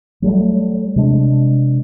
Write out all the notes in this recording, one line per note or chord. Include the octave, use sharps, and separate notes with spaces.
F#3 G3 A3
C3 G#3 D4